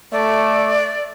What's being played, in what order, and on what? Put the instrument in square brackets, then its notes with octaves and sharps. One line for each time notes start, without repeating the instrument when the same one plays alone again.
[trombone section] A3 [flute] D5